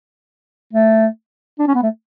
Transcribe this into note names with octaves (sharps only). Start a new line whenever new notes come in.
A3
D4
C#4
B3
A3